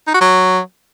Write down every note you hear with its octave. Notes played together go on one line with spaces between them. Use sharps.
D#4
F#4
F#3